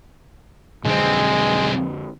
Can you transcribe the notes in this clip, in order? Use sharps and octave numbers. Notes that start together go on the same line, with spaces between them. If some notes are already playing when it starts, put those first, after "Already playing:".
B1 F2 D3 G#3 C4